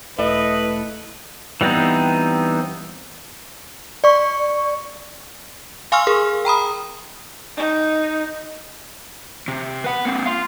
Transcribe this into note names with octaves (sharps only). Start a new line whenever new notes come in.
E1 A3 E4 B4 D#5
E3 G3 B3 C4 D#4
D5 C#6
F5 G#5 C6 C#6 E6 F6
G#4 A#4
G5 A#5 B5 D#6
D#4
C3
B4 F#5
A#3 C4
F5 C6